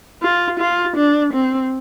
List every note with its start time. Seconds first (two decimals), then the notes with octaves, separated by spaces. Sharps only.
0.22 F4
0.59 F4
0.96 D4
1.33 C4